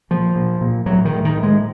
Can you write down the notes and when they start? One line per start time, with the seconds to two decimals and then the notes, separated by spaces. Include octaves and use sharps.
0.11 A#2 F3
0.36 A#2
0.61 A#2
0.86 A2 F#3
1.05 D#3
1.12 A2
1.25 D#3
1.37 A2
1.43 G#3